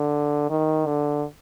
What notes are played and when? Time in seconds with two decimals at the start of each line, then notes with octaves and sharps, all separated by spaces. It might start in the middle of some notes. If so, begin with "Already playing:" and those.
Already playing: D3
0.50 D#3
0.86 D3